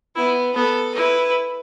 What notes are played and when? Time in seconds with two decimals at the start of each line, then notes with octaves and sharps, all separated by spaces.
0.16 B3 E4
0.56 B3 A4
0.95 E4 B4